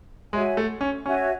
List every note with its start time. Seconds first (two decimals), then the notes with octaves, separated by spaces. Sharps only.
0.33 G#3 F#4 C#5 E5 G#5
0.57 A3
0.81 C#4
1.05 C#4 F#4 C#5 E5 G#5